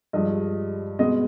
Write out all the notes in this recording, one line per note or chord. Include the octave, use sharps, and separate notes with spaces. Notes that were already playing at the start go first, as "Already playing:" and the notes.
G2 F3 G#3 D#5
B2 G#3 B3 D#5